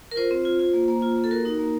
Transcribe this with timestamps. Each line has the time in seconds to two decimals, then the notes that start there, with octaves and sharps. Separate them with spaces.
0.11 A#4
0.16 F4 C5
0.31 C4
0.45 F4
0.59 F4
0.74 A#3
0.88 A#3
1.02 F4
1.16 A#3
1.24 A4
1.31 F#4 A#4
1.45 D#4
1.59 A#3